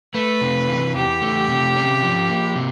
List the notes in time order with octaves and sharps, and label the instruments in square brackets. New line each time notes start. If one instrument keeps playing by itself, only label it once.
[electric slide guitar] A3 [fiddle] B4
[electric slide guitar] C3
E3
[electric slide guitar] E2 [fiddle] G4
[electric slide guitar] A3
C3
C#4
F3
A#3
C3